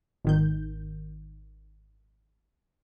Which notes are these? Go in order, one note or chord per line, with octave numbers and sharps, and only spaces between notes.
G#1 D#3 G6